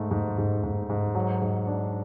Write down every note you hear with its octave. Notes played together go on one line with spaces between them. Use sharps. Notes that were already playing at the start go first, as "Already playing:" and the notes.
Already playing: G#2 A3
G#2
G#2
G#2
G#2
F#3
G#2
D4